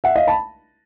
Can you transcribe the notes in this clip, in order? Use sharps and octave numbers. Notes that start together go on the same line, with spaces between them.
E5 F#5
D#5 F5
A5 B5